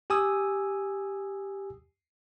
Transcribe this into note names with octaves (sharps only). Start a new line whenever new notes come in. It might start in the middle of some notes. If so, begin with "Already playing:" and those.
G4 G#5 D#6 E6